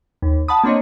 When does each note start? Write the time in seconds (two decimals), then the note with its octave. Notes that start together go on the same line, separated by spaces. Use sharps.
0.22 D#2
0.48 F#5 A5 B5 D#6
0.64 A#3 C4 D4 C#5 D#5